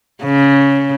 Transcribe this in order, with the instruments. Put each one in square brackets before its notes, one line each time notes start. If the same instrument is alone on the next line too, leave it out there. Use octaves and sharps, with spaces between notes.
[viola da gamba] C#3